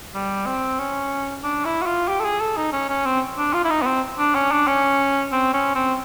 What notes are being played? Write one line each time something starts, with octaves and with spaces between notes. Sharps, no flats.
G3
C4
C#4
D4
E4
F#4
F4
G4
A4
G#4
A4
D#4
C#4
C#4
C4
D4
F4
E4
D#4
B3
C4
D4
C#4
D4
C#4
C4
C#4
C4